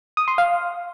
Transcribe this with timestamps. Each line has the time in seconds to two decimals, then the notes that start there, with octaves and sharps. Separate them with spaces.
0.17 D#6
0.28 C6
0.38 F5